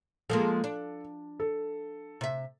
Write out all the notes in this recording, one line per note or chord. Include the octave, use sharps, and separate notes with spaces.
F3 G#3 A#3 A4
D4
A4
C3 E5